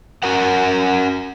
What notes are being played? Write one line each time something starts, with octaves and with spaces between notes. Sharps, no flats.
C#4 F#4 A#4 F#5